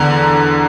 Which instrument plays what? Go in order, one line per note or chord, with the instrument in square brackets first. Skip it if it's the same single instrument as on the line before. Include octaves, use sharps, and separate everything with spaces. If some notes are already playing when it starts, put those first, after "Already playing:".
Already playing: [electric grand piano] E2 D3 A#5